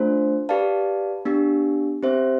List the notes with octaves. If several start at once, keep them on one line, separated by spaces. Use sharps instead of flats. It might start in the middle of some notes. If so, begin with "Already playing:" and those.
Already playing: A3 D4 F4 C5
G4 B4 D5 F5 A5
B3 D4 G4
C4 G4 C5 E5